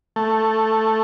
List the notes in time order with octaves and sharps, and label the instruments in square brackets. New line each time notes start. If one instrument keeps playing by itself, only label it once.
[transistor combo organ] A3